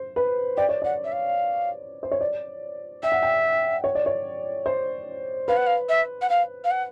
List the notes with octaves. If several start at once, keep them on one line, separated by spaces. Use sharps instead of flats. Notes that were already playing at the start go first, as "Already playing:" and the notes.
Already playing: C5
B4
D5 G5
C#5
D5 F#5
E5
F5
C5
C#5
D5
E5 G5
F#5
G5
C#5
D5
C#5
C5
B4 F5
F#5
F5
E5
F#5
F5
F5
F#5